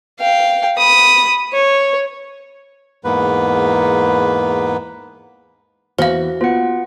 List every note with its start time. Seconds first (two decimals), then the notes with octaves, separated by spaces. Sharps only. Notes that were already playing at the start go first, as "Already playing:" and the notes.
0.19 F5 G5
0.78 B5 D#6
1.53 C#5
3.05 E2 G#2 A#3 B3 B4
5.98 E2 F#4 C5 F5
6.41 B3 F4 F#5